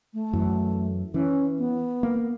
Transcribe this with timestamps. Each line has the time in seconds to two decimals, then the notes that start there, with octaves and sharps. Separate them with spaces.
0.14 A3
0.33 F#2 E3
1.14 E3 C#4
1.59 B3
2.03 A#3